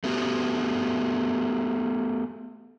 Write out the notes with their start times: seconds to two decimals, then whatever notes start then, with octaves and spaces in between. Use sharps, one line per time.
0.04 A3 B3 F#4 G4